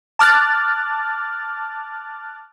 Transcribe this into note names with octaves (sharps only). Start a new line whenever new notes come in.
A5 D6 F6 F#6 A6